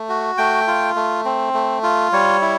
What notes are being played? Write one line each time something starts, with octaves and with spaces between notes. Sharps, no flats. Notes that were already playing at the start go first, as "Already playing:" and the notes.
Already playing: A3
F#4
A3 G5
F4
A3
C4
A3
F4
G3 C#5
E4